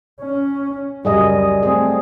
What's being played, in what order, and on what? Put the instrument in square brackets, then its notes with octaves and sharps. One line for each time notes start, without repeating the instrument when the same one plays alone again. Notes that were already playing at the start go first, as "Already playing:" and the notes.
[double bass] C#4
[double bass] C#2 F#2 [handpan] G3 G#4 D#5
[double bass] A3 C4 [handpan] G#4